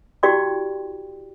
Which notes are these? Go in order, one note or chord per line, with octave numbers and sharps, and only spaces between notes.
E4 F#4 G4 D5 G5 C6